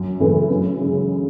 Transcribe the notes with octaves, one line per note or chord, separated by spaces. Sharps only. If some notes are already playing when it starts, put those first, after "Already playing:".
Already playing: F#2
C#3 E3 A3
F#2
C#3 G#3